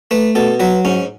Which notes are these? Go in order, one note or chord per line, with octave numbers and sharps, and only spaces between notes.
A3 B4
B2 A4
F#3 B4
G#2 C#4